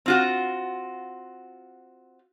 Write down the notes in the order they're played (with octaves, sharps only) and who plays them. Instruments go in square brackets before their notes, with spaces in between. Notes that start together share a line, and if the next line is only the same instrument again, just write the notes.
[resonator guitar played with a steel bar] C4 F4 F#4